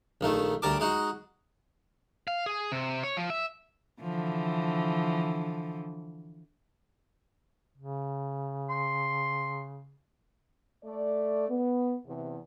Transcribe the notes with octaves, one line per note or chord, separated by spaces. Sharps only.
A#1 D#3 A3
D2 G3 A#4 A5 D6
G#3 D#4 F#4
F5
G#4
C3
C#5
F3
E5
D3 E3 F3
C#3
C6
A3 D5
B3
E2 C3